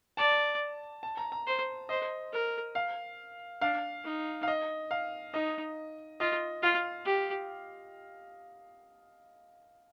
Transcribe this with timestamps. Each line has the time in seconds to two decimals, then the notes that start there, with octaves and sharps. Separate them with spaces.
0.17 D5 A5
1.03 A5
1.17 A#5
1.32 A#5
1.47 C5
1.89 C5 D#5
2.33 A#4
2.75 F5
3.61 D4 F5
4.04 D#4
4.43 F5
4.48 D#5
4.91 F5
5.33 D#4 D#5
6.20 F4 D#5
6.62 F4 F5
7.05 G4